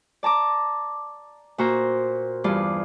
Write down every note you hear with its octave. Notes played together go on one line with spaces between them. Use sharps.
D5 A5 A#5 D6
A#2 F#4 C5 A#5
E2 G2 F4 D5